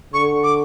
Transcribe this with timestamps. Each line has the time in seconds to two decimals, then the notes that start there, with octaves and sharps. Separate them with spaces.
0.14 D3 C#6
0.43 D6